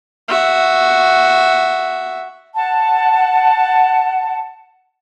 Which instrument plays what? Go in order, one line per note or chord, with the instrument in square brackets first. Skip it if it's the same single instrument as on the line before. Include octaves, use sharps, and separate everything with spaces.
[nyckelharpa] F#4 E5
[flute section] F#5 A5